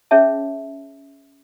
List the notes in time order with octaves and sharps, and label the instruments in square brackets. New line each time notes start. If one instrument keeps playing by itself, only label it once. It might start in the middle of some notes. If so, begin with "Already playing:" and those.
[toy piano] C#4 G#4 C#5 E5 A5